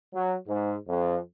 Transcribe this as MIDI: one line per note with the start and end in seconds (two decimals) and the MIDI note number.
0.14 0.35 54
0.48 0.74 44
0.88 1.17 41